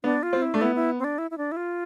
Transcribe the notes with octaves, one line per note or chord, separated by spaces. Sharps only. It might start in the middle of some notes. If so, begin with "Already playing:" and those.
B3 D4
F4
C4
E4
A3 D4
B3 E4
E4
C4
D4
E4
E4
D4
E4
F4